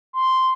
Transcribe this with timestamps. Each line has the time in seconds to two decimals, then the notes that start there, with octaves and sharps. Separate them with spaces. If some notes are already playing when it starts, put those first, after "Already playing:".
0.13 C6